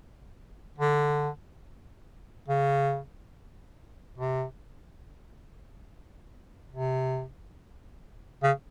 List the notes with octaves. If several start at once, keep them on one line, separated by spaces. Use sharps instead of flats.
D3
C#3
C3
C3
C#3